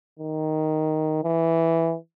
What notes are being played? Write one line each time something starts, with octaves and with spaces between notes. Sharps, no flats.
D#3
E3